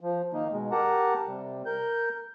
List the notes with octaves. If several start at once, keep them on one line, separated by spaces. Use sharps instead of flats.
F3
D#3 A#3 D#4
B2 G#3
G4 A#4 F#5 A5 A#5
C3 G3
A#4 G6